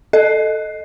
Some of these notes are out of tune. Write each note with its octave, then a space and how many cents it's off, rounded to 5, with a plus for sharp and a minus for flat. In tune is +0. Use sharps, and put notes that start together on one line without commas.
A4 +0 D#5 +0